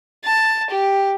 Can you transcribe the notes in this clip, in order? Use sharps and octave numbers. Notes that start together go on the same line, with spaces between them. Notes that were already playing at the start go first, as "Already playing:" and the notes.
A5
G4